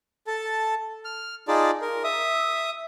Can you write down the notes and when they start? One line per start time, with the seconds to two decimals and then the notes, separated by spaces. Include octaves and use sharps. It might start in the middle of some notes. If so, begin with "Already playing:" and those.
0.27 A4 A5
1.05 F6
1.48 D#4 F4 G#4 D5 A5
1.81 A#4
2.04 E5 D#6